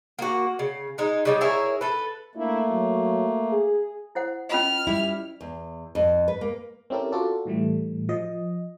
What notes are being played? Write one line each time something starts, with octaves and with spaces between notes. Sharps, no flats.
A#3 F#4
C#3
G#3 D#4
C#3 G3 G#3
E4 G#4 A#4 C#5
A4 B4
A3 A#3 D4 E4
F#3
G#4
E4 C5 F#5
C#4 F4 D#5 F6
G3 E4
E2
F2
B4
A#3
C4 C#4 E4 G4 A4 A#4
F4 F#4 A4 D5
A2 E3 G3 A3
F3 D#5